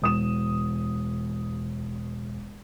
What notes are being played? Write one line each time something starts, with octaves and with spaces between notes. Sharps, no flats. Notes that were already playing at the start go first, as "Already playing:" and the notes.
E1 D#6 E7